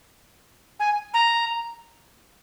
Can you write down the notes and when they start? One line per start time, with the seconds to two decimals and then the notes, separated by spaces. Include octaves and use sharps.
0.79 G#5
1.14 A#5